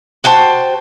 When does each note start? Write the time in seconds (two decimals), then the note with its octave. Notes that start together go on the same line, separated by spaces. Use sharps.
0.24 F#4 C5 G5 A5